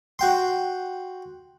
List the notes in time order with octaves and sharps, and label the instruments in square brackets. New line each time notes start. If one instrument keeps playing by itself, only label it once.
[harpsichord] F#4 G5 C6